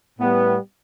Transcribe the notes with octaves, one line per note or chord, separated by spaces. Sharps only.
A2 G3 B3